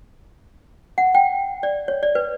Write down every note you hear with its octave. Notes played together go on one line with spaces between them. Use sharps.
F#5
G5
D5
C#5
D5
B4